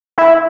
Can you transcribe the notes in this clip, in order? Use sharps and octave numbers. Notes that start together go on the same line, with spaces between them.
E4